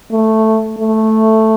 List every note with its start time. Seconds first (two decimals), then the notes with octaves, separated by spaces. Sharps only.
0.11 A3
0.78 A3